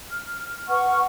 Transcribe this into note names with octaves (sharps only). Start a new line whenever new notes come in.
F6
B4 F#5 C#6 F6